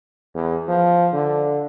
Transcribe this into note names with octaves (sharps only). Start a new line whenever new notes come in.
E2
F3
D3